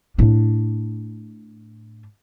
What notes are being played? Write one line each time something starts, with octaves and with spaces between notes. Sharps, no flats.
A2 D4